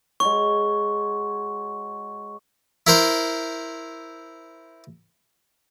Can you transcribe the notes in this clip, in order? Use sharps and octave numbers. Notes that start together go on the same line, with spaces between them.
G#3 F#4 C#5 C#6
E4 A#4 C5